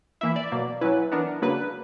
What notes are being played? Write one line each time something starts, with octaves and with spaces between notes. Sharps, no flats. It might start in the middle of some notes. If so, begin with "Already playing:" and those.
E3 A#3 E4 E5
D5
B2 F#3 A#3
F#3 C#4 E4 B4
E3 B3 D4 A#4
C#3 F#3 A#3 D4 B4